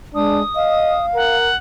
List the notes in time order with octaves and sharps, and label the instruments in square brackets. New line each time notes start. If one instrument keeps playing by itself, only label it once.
[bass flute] G#3 [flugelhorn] D4 [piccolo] D#6
[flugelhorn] D#5 [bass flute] F5
[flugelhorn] A#4 [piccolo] F#5